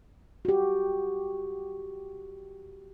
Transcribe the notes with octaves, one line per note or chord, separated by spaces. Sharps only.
F#4 G4